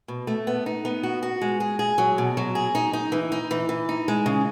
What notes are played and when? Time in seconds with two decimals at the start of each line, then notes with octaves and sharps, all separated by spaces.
0.08 B2
0.27 A3
0.47 B3
0.66 D#4
0.85 B3
1.03 F#4
1.23 F#4
1.42 G#3
1.60 G#4
1.79 G#4
1.98 F#3
2.18 B2
2.37 F#3
2.55 G#4
2.75 D#4
2.93 D#4
3.12 E3
3.32 D#4
3.51 E3
3.69 E3
3.89 D#4
4.08 G#3
4.26 C#3